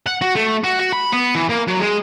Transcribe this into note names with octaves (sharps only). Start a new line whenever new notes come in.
F#5
F#4
A3
F#4
F#4
B5
B3
E3
A#3
F#3
G#3